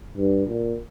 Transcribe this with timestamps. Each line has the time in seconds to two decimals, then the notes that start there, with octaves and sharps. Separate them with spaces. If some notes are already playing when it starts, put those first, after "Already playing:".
0.18 G2
0.47 A#2